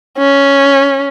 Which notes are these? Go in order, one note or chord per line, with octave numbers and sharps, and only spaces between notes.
C#4